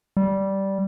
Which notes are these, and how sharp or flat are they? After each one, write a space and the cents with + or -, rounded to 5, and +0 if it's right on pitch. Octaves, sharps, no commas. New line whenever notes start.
G3 -10